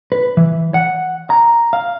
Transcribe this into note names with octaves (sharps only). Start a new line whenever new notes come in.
B4
E3
F#5
A#5
F5